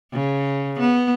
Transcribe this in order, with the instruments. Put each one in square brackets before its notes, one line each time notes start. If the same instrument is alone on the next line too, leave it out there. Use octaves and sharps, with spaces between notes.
[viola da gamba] C#3
B3